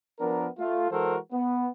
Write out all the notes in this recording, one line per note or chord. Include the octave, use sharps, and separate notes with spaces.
F3 B3 D4 A#4
A3 F4
E3 G#3 F#4 A4 A#4 C5
B3